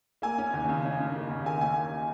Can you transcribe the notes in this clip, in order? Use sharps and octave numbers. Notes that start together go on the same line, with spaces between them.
A#3 G#5
C#4
D#2
C#3
C#4
C#4
A#3
D#2
A#3 G#5
C#4 G#5